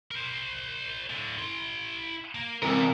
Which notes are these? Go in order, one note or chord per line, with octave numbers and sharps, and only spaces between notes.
A#4 C5
A2 D3
E4 C6
A#3
C3 E3 A#4